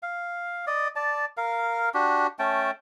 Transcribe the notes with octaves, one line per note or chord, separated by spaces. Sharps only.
F5
D5 D#5
D5 A5
A#4 F5
D4 F#4 G4
A3 C#4 G5 A5